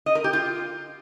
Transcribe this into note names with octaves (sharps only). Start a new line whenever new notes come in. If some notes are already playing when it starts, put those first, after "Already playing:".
D#5
A#4
G4
F4